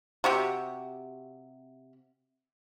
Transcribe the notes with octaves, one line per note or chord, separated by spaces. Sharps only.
C3 F#4 G4